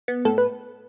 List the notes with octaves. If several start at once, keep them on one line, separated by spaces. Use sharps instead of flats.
B3
A2 A4
B4